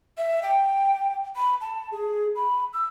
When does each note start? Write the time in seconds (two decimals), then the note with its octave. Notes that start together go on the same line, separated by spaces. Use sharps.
0.18 E5
0.43 G5
1.36 B5
1.61 A5
1.92 G#4
2.35 B5
2.73 E6